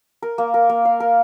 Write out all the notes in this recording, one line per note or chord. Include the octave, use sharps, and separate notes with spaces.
A#4
A#3
A#4
A#3
F5
A#4